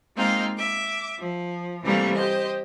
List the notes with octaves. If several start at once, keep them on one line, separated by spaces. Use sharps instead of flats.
G#3 A#3 C4 D#4 F4
E5 D6
F3
C3 E3 G3 A3 A#3 C4
G4 C5 D#5